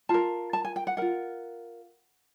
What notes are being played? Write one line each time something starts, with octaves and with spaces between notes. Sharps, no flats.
F4 A#4 A5
A5
G#5
G5
F#5
F4 A#4 F#5